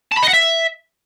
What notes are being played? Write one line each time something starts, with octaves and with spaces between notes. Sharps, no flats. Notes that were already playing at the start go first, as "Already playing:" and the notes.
A5
B5
D#5
F#5
E5